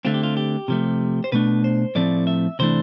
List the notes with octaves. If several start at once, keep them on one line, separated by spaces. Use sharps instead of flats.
D3 A3 C4 F4
G4
F4
G4
C3 F3 A3
C5
B2 A3 D4 B4
C5
A2 F3 A3 C4 D5
E5
C3 E3 A3 D4 C5